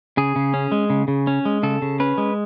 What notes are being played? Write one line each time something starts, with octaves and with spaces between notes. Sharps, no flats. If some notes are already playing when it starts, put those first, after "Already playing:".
C#3 G#4
C#3
C#4
G#3
C#3
C#3
C#4
G#3
C#3 A4
C#3
C#4 B4
G#3